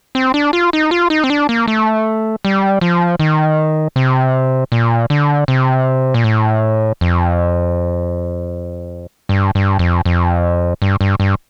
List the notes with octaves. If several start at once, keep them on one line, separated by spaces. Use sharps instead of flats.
C4
D4
F4
D#4
F4
D#4
C4
D4
A#3
A3
G3
F3
D#3
C3
A#2
D3
C3
A#2
A2
F2
G2
G2
F2
F2
G2
G2
G2